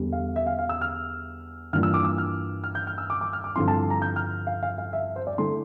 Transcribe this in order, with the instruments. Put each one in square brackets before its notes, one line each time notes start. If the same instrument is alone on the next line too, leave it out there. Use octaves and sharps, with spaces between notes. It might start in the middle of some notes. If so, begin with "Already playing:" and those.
Already playing: [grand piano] E2 D3 G3
F5
E5
F5
F5
E6
F6
G2 E3 A#3 D4 F4 F6
E6
D6
E6
F6
F6
G6
F6
E6
D6
D6
F6
D6
G2 D3 F3 C4 E4 C6
A5
A#5
G6
F6
F5
F5
F5
E5
C5
D5
D3 A3 E4 C6